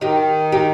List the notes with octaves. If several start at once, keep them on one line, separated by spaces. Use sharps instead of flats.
D#3 D#4 G4
D#4 G4